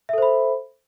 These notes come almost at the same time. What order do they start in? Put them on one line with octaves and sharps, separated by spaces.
E5 A4 C5 B5